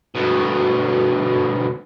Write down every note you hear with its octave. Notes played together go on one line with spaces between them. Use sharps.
D2 B2